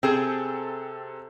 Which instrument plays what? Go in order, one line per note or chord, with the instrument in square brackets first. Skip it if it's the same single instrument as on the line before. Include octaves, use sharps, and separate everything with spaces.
[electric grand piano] C3 A4 G6 [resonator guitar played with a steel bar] C4 G#4